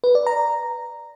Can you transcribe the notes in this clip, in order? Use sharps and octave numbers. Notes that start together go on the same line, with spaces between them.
B4
D5
A#5